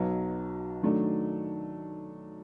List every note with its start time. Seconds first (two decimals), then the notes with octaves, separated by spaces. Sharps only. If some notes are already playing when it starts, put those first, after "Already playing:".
Already playing: B1 B2 F#3
0.82 D#3 F#3 A3 D4